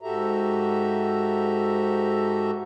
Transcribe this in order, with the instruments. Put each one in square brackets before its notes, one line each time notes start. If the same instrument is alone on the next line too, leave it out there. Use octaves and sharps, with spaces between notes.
[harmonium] G#2 F#4 G4 A4 E5 A#5